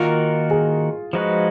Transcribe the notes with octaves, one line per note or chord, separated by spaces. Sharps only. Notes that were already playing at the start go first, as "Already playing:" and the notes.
Already playing: D#3 A#3 D#4 F4 F#4 A#4
G#4
F3 G#3 D#4 F#4 B4